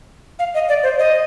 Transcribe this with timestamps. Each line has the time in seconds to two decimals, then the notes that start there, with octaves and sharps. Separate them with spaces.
0.39 F5
0.54 D#5
0.69 D5
0.83 C5
0.99 D#5